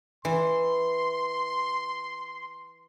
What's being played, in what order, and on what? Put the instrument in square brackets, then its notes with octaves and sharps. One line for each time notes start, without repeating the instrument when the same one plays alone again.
[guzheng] E3 [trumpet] C6